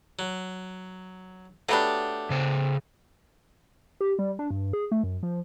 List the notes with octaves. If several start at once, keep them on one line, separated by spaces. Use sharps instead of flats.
F#3
F#3 A3 B3 D4 G4
C#3 C5
G4
G3
D4
G2
G#4
A3
F#2
F3